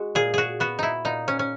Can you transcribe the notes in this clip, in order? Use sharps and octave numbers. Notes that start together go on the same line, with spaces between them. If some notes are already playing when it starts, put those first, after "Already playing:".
Already playing: G#3 F#4
A#2 G#4
F#4 G#4
B3 F#4
D#4 E4
A#2 D#4
C#4
C#4